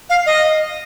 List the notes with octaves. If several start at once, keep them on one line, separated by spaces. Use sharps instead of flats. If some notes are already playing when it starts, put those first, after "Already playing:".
F5
D#5